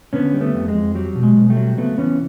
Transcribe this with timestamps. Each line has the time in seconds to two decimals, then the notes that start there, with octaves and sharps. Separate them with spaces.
0.13 D3 B3 C#4
0.34 G3
0.41 A3 B3
0.55 F2
0.68 G#3
0.75 F2
0.95 F#3 G3
1.15 B2
1.23 G#3
1.37 B2
1.50 G3 A3
1.56 F#3
1.78 C#3 A3 B3
1.98 E3 B3 C#4